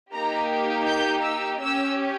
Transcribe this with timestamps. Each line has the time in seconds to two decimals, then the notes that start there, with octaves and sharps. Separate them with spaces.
0.13 A#3 D#4 G4 A#5
0.86 G6
1.23 E6
1.60 C#4 G4 E6